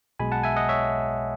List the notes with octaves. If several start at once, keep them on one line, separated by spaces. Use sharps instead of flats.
B1 B2 G#3 G#5 B5
F#5 A5
E5 G#5
D#5 F#5
C#5 E5